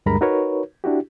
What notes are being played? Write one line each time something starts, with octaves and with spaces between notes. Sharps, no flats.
D2 G2 G#3 A#4 A#5 B5
D#4 F#4 A#4 B4 C#5
D4 E4 F#4 G4